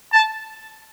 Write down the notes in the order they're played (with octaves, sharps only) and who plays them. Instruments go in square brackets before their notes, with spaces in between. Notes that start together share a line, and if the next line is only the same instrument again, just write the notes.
[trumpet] A5